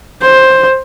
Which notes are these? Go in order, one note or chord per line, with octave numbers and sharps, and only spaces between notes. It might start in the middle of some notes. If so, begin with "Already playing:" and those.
C5